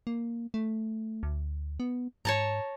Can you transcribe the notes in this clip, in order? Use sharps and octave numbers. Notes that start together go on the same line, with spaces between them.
A#3
A3
D2
B3
G#2 C#5 A5 A#5